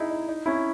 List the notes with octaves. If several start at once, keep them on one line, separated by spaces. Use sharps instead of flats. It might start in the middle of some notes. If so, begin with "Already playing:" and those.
Already playing: D#4 E4 G#4
D#4
D#4
C#4 E4